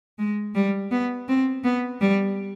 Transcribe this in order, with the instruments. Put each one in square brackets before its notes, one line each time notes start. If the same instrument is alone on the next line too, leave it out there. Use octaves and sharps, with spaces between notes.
[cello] G#3
G3
B3
C4
B3
G3